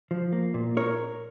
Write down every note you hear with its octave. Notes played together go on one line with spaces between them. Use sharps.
F3
A#3
A#2
A#4 C#5